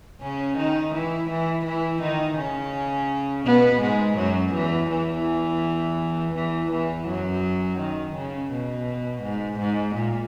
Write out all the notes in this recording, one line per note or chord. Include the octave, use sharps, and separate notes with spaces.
C#3 C#4
D#3 D#4
E3 E4
E3 E4
E3 E4
D#3 D#4
C#3 C#4
B2 B3
G#2 G#3
F#2 F#3
E2 E3
E2 E3
E2 E3
E2 E3
F#2 F#3
D#3
C#3
B2
G#2
G#2
A#2